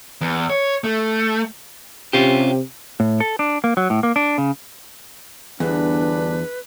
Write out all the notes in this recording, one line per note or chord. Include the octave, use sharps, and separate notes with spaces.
E2
C#5
A3
C3 C#4 F4 G4
A2
A4
D4
A#3
F#3
A2
A#3
D4
C#3
G1 E2 D4 B4